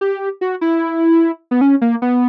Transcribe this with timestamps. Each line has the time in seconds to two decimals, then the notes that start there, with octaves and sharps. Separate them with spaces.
0.01 G4
0.41 F#4
0.61 E4
1.51 B3
1.61 C#4
1.81 A#3
2.02 B3